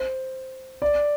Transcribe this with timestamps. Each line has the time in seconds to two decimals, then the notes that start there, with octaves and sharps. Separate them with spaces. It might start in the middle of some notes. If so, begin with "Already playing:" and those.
Already playing: C5
0.82 D5